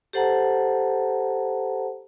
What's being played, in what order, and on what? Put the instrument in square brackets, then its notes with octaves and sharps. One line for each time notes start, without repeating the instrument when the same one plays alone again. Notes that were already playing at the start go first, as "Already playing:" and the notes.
[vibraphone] G4 A4 C5 F#5 A5 A#5